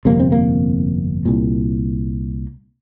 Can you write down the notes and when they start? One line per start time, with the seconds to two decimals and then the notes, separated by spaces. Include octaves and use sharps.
0.05 G1 F2 C3 A#3
0.19 C4
0.32 A#3
1.25 C2 A#2